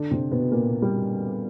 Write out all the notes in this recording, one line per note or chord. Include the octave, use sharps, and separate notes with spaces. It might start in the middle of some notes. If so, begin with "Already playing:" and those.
Already playing: D3 D4
C3 C4
B2 B3
A#2 A#3
G3